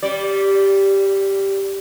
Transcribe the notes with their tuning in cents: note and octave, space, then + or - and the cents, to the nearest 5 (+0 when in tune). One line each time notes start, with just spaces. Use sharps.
G3 +0 D5 -20